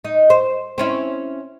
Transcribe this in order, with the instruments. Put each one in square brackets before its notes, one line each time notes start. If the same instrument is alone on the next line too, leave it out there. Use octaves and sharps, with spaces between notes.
[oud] D#4
C5
C4 C#4 E4